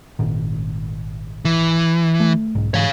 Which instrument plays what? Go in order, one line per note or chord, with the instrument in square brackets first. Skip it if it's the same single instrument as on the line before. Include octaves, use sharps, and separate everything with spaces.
[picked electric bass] G#1 A#2 D#3
[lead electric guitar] E3
[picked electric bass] A3
B1 G#2
[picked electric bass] G#2 E3 [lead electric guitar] C#5 F5